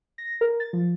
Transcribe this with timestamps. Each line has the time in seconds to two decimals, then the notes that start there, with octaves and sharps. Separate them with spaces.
0.18 A#6
0.41 A#4
0.60 A6
0.73 F3